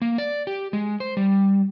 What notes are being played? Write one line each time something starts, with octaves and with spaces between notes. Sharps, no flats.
A#3
D5
G4
G#3
C5
G3